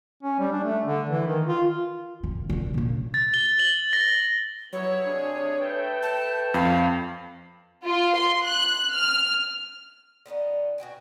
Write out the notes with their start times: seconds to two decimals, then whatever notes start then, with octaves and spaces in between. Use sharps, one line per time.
0.23 C#4
0.39 G3
0.52 D4
0.64 A3
0.86 D3
1.10 E3
1.27 D#3
1.46 F4
2.23 D3
2.50 B2 D3
2.74 A#2 C#3
3.14 A6
3.34 G7
3.59 F#7
3.93 A#6
4.09 G7
4.73 G2 F#3 B3 E4 C#5
5.07 C3 D4 G#4
5.61 A3 A4 B4 G5
6.03 A5
6.54 F2 F5
7.85 F4
8.16 C6
8.45 F#6
8.92 F6
10.26 D3 B3 C#4 D#4
10.78 B2 F#4 G5 G#5